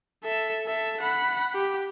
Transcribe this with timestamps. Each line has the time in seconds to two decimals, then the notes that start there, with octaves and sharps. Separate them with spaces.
0.24 A4 E5
0.67 A4 E5
1.01 F#5 B5
1.53 G4